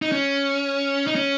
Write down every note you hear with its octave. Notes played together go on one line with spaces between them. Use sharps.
D#4
C#4
D#4
C#4